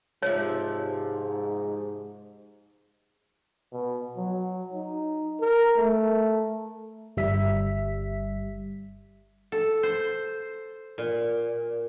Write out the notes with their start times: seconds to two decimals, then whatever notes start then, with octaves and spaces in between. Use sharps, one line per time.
0.22 G#2 C3 F3 C#5
3.73 B2
4.17 F#3
4.74 D#4
5.40 A#4
5.77 A3
7.17 G1 G3 E5 B6
9.52 A4
9.83 C5
10.98 A#2